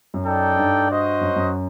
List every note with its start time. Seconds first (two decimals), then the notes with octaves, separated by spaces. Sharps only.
0.14 F#2
0.25 D#4 A4 D5 G5
0.57 G2
0.89 F#4 C5 D#5
1.21 F#2
1.36 F#2